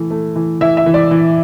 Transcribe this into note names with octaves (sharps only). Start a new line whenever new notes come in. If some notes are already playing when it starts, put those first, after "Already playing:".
Already playing: E3 A3
A3
E3
E3 E5
E5
E3
D5
E3